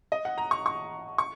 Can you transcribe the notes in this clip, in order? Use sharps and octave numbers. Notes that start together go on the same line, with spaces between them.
D#5
F#5
A#5
C#6
C#6
C#6